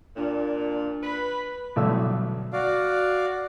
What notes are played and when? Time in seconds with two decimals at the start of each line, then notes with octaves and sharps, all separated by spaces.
0.17 A#2 D4
1.03 B4 B5
1.76 B1 G2 D3 A3 E6
2.52 F#4 D5 F5